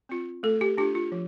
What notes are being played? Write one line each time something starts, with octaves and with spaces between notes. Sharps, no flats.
C4 F4
A3 A4
G4
D4 F4 G4
F4
F3